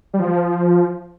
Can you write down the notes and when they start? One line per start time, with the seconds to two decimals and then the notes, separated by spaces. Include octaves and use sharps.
0.13 G3
0.20 F3